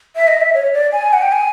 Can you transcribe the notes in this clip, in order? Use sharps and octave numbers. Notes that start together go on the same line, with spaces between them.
E5
D#5
E5
C#5
D5
G#5
F#5
G5
G#5